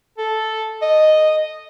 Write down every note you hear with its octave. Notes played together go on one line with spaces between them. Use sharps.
A4
D#5